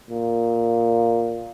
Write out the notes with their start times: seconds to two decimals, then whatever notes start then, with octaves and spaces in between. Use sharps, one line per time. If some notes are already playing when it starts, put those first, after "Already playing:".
0.10 A#2